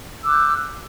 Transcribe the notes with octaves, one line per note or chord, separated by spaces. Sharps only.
D6 E6 F#6 G6